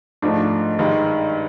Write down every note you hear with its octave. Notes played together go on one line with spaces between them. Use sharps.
G#2 F3 A3 D4
G2 D#3 G#3